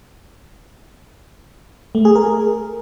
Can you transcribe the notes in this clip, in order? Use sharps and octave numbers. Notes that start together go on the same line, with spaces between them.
A3
G#4
A#4